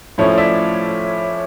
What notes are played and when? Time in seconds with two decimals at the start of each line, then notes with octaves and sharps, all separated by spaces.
0.18 A2 F3 A3 C#4 E4 C#5
0.37 D5 E5